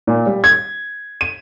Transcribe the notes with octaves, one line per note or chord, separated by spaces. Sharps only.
A#2
G3
G#6
D#7